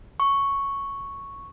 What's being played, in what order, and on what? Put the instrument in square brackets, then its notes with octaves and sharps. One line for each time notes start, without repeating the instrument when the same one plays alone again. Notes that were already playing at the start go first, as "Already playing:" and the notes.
[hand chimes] C#6